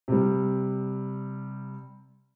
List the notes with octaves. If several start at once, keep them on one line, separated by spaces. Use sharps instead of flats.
C3 G3